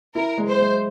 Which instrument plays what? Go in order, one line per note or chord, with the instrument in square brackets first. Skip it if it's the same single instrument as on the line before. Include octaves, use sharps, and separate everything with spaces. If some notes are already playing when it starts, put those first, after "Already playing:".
[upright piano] E4 [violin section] A#4
[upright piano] G#3
[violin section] C5
[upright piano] G#3